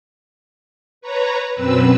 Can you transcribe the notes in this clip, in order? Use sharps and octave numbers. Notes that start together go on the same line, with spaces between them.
B4 C#5 A#5
F#2 B2 C4 B4 E6